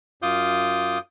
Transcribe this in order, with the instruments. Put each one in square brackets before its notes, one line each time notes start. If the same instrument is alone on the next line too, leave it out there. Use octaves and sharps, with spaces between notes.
[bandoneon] F#2 F4 F5 D6 D#6 G6